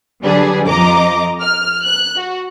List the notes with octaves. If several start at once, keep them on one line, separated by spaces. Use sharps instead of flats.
D3 F#3 G3 D4 G#4 B4
F2 F3 D#5 A#5 D6
F6
F#6
F#4